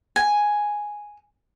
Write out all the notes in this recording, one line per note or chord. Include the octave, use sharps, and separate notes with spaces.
G#5